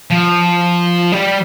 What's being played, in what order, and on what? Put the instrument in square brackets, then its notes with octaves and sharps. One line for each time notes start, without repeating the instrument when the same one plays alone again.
[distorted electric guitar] F3
G3